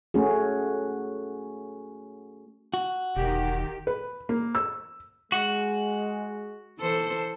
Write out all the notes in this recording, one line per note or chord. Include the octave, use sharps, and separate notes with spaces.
A3 C#4 F#4 G#4
F#4
E1 D#3 G4
B4
A#3
E6
G#3 F#4
E3 A4 C5